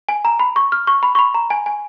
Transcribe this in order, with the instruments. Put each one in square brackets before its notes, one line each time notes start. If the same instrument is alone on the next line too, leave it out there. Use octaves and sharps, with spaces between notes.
[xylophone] G#5
A#5
B5
C#6
F6
C#6
B5
C#6
B5
A#5
G#5
G#5